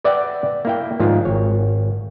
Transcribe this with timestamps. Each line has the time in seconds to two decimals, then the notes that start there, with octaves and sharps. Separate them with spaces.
0.04 B4 D5 E5 F#5 G5
0.65 A#3 E4 G5
1.00 G#2 D#3 F3 F4
1.25 G#1 C#5